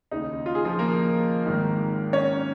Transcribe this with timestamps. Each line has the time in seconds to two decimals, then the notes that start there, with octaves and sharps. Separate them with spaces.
0.11 D#2 C#3 D#4
0.46 F4
0.55 G#4
0.65 F3 F4
0.79 A#3 A#4
1.46 G#1 G#2 D#3
2.13 C#4 C#5